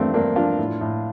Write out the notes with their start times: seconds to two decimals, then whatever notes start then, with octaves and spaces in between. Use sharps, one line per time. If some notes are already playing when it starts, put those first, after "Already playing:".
Already playing: E2 G2 F3 A3 A#3 C4 D4
0.14 G2 A#3 D4
0.36 F3 D4 F4
0.58 A2
0.81 A2